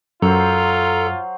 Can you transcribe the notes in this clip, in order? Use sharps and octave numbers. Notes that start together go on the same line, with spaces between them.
F#2 F#3 F4 A4 C5 A#5